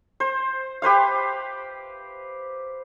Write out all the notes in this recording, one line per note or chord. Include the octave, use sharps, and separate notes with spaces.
C5
G4 B4 C5 F5